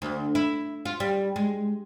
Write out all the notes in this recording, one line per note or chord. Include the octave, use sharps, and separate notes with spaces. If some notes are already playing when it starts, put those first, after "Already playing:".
D2
E4
F4
G3
G#3